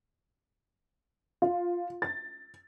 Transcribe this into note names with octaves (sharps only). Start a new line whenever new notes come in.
F4
A6